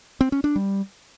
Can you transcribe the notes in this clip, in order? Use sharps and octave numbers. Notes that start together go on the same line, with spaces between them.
C4
C#4
D4
G3